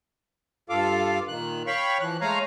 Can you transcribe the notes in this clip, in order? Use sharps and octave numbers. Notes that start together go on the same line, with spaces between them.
G2 F4 A4 F5 D6
A#2 D#3 F#6
C#5 F5 G5 B5 C#6
E3 F3 F#6
G#3 A3 C#5 F5 G#5 A#5